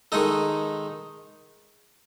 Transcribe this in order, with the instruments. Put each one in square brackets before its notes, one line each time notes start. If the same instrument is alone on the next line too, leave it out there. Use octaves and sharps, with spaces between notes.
[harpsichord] D#3 G#3 D#4 A4